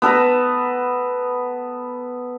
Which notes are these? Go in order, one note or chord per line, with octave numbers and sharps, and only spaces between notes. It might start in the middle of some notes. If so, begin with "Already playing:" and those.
B3 A4 B4 A#5